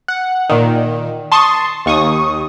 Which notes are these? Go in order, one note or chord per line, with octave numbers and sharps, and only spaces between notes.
F#5
A#2 D#3
A5 C6 C#6 D#6
D#2 C#6 D#6